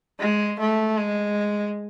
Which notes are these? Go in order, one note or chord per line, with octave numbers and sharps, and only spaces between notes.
G#3
A3
G#3